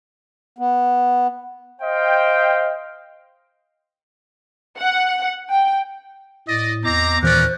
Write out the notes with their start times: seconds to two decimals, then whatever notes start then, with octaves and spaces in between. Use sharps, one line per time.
0.58 B3
1.81 C5 D#5 F5 G5
4.79 F#5
5.50 G5
6.48 A2 D5 D#5
6.84 E2 C4 D#5 A#5 D6
7.23 D#2 A#2 E3 C#4 A#4 C5 D5 F#6